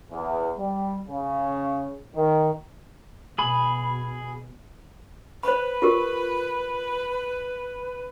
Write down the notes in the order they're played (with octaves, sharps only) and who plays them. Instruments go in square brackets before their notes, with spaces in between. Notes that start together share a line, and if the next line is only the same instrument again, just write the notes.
[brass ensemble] E2
G3
C#3
D#3
[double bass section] B2 [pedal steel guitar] G#4 B5
[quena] B4 [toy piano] C5 B5
[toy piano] F4 G4 A#4